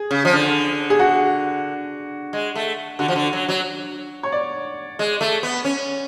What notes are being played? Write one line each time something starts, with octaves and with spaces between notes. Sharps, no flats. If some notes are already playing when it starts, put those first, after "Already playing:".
Already playing: G#4
C#3
F3
D3
G#4
F#4
G#3
A3
D3 F#4
F3
D3
F#3
F#3
C#5
D5
G#3
A3
B3
C#4